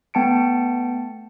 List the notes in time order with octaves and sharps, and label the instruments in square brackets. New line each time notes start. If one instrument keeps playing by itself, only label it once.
[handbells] A3 B3 G5 A5 C#7 D7